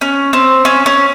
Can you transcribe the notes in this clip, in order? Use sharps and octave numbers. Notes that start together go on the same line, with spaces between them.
C#4
C4
C#4
C#4